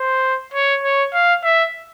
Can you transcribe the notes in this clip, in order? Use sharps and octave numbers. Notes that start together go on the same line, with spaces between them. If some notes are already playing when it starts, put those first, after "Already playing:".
Already playing: C5
C#5
C#5
F5
E5